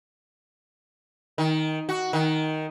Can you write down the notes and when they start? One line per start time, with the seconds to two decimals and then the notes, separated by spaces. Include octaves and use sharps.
1.38 D#3
1.89 F#4
2.13 D#3